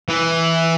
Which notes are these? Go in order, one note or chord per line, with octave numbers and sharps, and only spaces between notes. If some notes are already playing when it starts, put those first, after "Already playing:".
E3